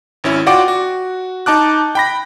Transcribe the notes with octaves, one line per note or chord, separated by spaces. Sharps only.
G#1 C#4 E4
F4 F#4 D5 F#5 G5 D6
F#4
D#4 A5 D6 F#6
G5 B5 A#6